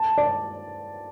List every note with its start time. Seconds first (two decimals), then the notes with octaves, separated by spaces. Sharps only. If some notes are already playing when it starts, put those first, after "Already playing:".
Already playing: A5
0.18 D5